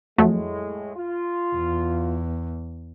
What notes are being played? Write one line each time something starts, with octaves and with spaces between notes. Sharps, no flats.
F2 A2 F#3 G#3 A3
F4
E2